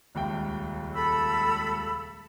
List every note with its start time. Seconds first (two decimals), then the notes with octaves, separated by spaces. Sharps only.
0.15 D#1 C#2 G5
0.94 A4 B5 E6